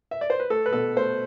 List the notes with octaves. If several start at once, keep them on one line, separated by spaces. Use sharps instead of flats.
E5
D5
C5
B4
A3 A4
B4
B2 A4
A3 C5